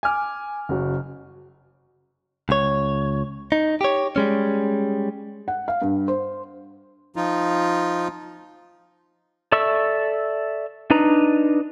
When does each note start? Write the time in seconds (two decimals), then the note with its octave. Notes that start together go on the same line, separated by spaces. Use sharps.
0.03 G#5 D6 F6
0.69 F#1 F#3
2.49 C#2 C#5
3.52 D#4
3.81 G4 C#5
4.16 G3 G#3 C#4
5.48 F#5
5.68 F5
5.82 G2
6.08 C5
7.16 F3 D#4 F4
9.52 A4 D5 E5 C#6 E6
10.90 D4 D#4 B4 A#5